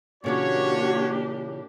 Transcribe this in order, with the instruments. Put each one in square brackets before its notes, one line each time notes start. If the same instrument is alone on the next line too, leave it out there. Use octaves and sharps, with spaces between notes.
[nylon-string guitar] A#2 C#3 E3 [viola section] A#3 D4 G4 [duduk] F#4 [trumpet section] C#5